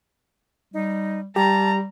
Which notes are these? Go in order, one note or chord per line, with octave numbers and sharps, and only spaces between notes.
G3 D#4
G3 G4 A5 A#5